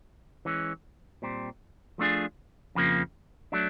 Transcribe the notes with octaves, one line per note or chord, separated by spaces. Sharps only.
E3 G#3 C#4
A#2 G3 C4
F3 A3 D4 F4 G#4
F2 C#3 F3 A#3
F#3 A3 D4